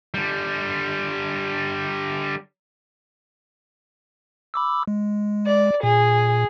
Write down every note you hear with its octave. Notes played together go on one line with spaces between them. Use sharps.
D3 G3
B5 D6 E6
G#3
D5
A#2 G#4